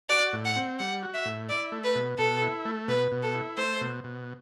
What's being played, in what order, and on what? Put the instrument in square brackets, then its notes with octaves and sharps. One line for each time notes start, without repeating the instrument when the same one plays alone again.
[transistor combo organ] F#4 [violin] D5
[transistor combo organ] A2
[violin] F#5
[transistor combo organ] C4
[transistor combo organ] G3 [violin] F#5
[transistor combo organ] F#4
[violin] E5
[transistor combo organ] A2
[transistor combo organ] E4 [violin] D5
[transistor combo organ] A3
[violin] B4
[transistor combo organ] B2
[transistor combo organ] B2 [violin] A4
[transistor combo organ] E4
A3
[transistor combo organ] B2 [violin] B4
[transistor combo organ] B2
[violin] A4
[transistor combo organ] E4
[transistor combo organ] A3 [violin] C5
[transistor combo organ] B2
B2